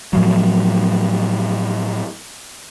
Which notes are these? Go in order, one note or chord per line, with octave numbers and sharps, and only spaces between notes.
A2 F3 F#3